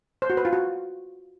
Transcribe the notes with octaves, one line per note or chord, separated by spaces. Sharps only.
C5
F#4
B4
F4
F#4